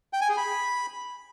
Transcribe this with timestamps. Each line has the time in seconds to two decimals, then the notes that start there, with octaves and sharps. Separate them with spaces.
0.13 G5
0.21 G#5
0.29 G#4
0.37 B5